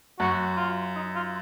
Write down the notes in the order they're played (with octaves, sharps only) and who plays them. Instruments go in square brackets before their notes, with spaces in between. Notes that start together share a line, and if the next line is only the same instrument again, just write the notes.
[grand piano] F#2 [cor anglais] F#4
[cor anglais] F4
D#4
F4